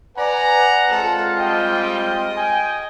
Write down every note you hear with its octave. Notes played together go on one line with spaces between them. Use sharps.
B4 D5 F#5 G#5 A#5
G#3 C4 F4 A4
G3 D#5 G5
G5 G#5